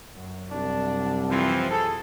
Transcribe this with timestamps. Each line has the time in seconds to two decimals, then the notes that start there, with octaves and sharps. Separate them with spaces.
0.15 F#2
0.51 C2 D4
1.29 E3 F3 C4
1.71 G#4 A4